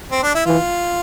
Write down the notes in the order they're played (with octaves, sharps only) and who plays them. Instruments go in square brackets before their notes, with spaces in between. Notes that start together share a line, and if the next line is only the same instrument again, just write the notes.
[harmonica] C4
D4
E4
[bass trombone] E3 [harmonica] F4